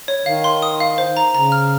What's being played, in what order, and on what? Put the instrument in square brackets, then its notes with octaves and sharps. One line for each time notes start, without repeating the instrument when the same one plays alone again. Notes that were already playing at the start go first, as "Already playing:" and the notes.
[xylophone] C#5
[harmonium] D#3 [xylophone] F5
[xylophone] C6
D#6
F5
C5
A#5
[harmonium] C#3 [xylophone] A#5
[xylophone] F6